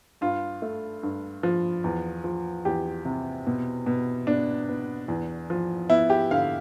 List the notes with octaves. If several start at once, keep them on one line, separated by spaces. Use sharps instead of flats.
G2 F4
A3
G2
F3
E2
F3
E2 G4
C3
B2
B2
B3 D4
B3
E2
F3
B3 E4
G4
D3 F5